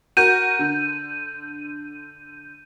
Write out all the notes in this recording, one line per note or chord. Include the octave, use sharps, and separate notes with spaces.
F#4 A#4 G6 D#7
D3